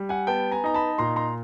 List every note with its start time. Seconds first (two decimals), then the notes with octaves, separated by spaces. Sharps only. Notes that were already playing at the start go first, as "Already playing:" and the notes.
Already playing: G3
0.09 F#5 G#5
0.27 B3 G5 A5
0.51 G#5 A#5
0.64 D#4 A#5
0.74 A5 B5
0.98 A#2 A#5 C6
1.16 A#5 C6